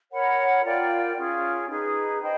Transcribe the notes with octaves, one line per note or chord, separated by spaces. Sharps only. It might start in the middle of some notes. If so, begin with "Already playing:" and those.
A#4 C#5 F#5 B5
F4 A#4 D5 G5
C#4 F4 G#4
D#4 G#4 B4
C5 D#5 G5 B5